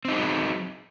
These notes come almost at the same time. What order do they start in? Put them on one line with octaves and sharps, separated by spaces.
C4 D#4 G#4 F#3